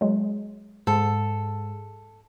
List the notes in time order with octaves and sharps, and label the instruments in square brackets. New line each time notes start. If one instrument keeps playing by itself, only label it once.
[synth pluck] F#3 G#3
[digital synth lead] G#2 [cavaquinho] A4